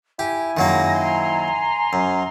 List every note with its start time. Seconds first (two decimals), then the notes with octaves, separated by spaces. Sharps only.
0.19 E4 G4 G#5
0.57 F#2 D#3 F#3 G#3 A#3 A#6
0.97 A#5 C6
1.93 F#2